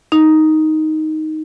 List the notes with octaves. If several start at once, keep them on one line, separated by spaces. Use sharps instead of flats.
D#4